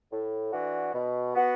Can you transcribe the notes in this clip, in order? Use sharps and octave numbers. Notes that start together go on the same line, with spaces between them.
A2
E3 D4 F#4
B2
B3 F#4